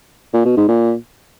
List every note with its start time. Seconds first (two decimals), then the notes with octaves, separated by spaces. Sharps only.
0.34 A#2
0.45 B2
0.57 G#2
0.68 A#2